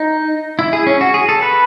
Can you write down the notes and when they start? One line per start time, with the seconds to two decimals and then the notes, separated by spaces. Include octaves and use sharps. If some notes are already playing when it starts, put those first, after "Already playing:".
Already playing: D#4
0.59 E4
0.73 G#4
0.87 C#4
1.01 F#4
1.14 G#4
1.29 A4
1.42 B4